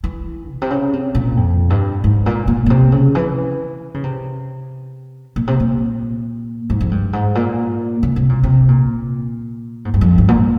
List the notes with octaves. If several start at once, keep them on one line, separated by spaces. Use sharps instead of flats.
E3
A#2
C3
C#3
C3
A#2
F2
G2
G#2
A#2
A#2
A#2
C3
C#3
E3
C#3
C3
A#2
C3
A#2
G#2
F2
G2
G#2
A#2
C#3
C3
A#2
C3
A#2
G#2
G2
F2
G2
A#2